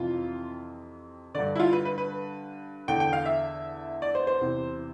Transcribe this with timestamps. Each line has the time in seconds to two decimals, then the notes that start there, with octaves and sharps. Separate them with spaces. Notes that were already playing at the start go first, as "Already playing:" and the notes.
Already playing: F2 C3 E3 F4
1.34 G2 D3 D5
1.56 E4
1.60 F4
1.73 B4
1.85 B4
1.98 B4
2.88 E2 D3 G5
3.00 G5
3.13 F5
3.26 E5
4.02 D5
4.15 C5
4.27 C5
4.41 E2 C3 E3